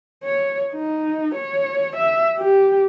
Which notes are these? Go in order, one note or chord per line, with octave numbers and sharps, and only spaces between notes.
C#5
D#4
C#5
E5
G4